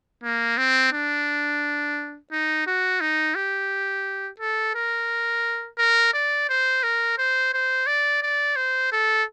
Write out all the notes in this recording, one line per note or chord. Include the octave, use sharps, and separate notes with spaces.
A#3
C4
D4
D#4
F#4
D#4
G4
A4
A#4
A#4
D5
C5
A#4
C5
C5
D5
D5
C5
A4